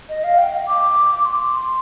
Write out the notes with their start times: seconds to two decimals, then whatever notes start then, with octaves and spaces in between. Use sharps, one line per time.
0.09 D#5
0.24 F5
0.38 G5
0.68 D6
1.15 D6
1.25 C6